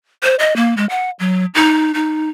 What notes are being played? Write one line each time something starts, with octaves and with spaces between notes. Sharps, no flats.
C5
D#5
A#3
G#3
F#5
F#3
D#4
D#4